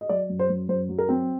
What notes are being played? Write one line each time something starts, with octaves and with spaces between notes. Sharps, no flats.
D#5
F#3 D5
F#2
C5
F#2
F#2 C5
F#3
A#4
C4